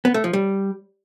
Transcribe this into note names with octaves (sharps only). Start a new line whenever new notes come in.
B3
A3
F3
G3